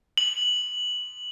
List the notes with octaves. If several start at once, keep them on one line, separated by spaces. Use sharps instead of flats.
F#7